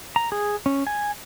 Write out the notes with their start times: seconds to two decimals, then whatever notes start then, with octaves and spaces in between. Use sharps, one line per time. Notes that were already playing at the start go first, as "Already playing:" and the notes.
0.16 A#5
0.32 G#4
0.66 C#4
0.87 G#5